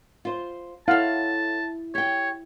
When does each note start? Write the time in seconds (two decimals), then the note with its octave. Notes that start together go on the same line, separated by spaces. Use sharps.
0.25 F4 C5
0.88 E4 A4 C#5 F5 F#5 A5
1.95 G4 C#5 G5